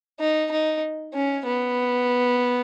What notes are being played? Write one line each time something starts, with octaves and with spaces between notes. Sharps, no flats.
D#4
D#4
C#4
B3